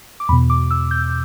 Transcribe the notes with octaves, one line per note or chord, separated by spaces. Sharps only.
D6
E2 B2 B5
D6
E6
G6